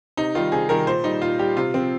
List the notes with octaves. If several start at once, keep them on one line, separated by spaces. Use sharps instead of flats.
C3 D#4
D#3 G3 F4
C3 G#4
D#3 G3 A#4
A#2 C5
G3 D#4
A#2 F4
G3 G4
C3 F4
F3 C4